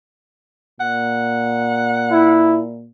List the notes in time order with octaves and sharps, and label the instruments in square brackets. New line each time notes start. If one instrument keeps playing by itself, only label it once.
[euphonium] A#2 [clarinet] F#5
[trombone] E4